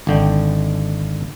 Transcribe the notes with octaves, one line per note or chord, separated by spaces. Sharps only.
G#1 D3 G5